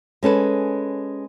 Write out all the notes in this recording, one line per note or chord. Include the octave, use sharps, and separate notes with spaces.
G#3 C#4 A4 B4